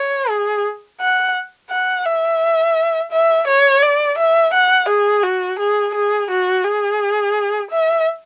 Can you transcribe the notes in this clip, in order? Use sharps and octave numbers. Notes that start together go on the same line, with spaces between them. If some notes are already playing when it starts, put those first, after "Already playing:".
Already playing: C#5
G#4
F#5
F#5
E5
E5
C#5
D5
E5
F#5
G#4
F#4
G#4
G#4
F#4
G#4
E5